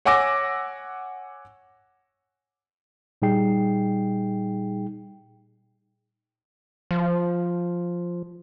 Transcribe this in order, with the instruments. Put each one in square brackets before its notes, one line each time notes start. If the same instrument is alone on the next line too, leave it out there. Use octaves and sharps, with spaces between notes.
[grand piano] C#5 F#5 G#5 D6 E6 A#6
[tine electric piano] A#2 G3 D#4 G#4 G5 C7
[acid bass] F3